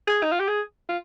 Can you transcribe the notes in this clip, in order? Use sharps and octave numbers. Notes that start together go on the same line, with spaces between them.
G#4
D#4
F4
G4
G#4
F4